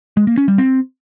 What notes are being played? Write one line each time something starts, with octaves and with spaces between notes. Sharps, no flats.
G#3
A#3
C#4
G3
C4